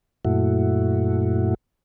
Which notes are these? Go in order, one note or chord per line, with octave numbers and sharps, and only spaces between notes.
F#2 A#2 A3 E4 F#4